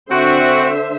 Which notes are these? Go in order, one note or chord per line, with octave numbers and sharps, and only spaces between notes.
D3 C4 F#4 C5 E5